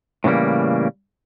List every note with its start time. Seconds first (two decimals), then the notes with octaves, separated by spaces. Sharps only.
0.24 A2 C#3 E3 G3 A#3